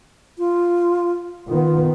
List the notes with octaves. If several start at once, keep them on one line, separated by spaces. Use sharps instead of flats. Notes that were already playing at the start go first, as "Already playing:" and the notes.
F4
D#3 B3 F4